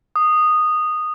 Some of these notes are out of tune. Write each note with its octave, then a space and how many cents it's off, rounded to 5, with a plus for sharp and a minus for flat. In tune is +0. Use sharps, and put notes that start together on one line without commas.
D#6 -10